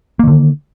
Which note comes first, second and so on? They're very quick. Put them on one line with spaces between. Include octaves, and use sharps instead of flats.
A#3 D#3 D3